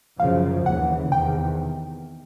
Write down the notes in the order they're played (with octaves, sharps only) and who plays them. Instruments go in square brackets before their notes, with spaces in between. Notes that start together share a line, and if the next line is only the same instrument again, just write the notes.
[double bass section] F#2 C#3 F3 [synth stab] F5
[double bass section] D#2 C#3 E3 [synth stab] F#5
[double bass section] E2 C3 D#3 [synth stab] G5